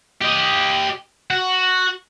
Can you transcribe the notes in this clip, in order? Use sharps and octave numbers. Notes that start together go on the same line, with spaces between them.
G4 D#5
F#4